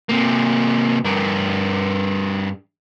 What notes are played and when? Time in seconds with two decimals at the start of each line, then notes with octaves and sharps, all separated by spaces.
0.09 C3 A#3
1.04 G2 A#4